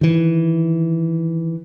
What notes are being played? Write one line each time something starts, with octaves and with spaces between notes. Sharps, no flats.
D#3 E3